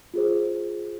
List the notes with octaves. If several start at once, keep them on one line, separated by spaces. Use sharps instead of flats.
F4 G#4 C5